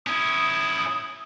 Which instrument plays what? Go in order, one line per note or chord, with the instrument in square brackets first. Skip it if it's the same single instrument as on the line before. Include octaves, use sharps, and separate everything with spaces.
[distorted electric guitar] C#4 E4 [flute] D#6